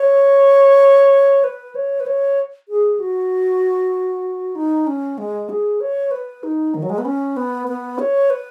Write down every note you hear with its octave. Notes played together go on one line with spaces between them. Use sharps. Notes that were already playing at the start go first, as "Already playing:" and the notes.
Already playing: C#5
B4
C#5
B4
C#5
G#4
F#4
D#4
C#4
G#3
G#4
C#5
B4
D#4
D#3
F#3
G#3
B3
C#4
B3
B3
C#5
B4